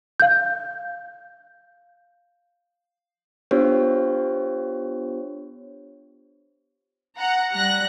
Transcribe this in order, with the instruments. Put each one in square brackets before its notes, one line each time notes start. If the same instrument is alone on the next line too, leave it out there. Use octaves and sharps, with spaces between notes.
[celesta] F5 G6
[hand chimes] B3 D4 F4 G4 C5 C#5
[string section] F#5 A#5
G3 F#6 A#6